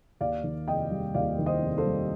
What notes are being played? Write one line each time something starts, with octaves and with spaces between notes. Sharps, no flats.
D#2 D5 F5
D#3
F1 D#5 G5
G3
D#2 D5 F5
D#3
C5 D#5
F1
A4 C5
G3